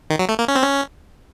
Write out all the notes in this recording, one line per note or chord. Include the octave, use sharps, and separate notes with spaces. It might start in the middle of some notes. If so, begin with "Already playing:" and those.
D#3
F#3
A3
A#3
C#4
C4
C#4